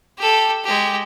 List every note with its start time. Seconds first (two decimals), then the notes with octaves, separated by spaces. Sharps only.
0.18 G4 A4
0.64 G#3 G4